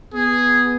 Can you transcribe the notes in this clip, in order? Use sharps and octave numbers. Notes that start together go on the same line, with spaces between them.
B3 G#4